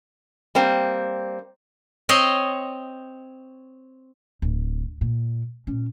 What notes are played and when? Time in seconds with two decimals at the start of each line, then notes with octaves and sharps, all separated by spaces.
0.55 G3 A#3 C4
2.09 C4 C#5 D#5 C6
4.42 D1
5.01 A#2
5.67 A#2 C#4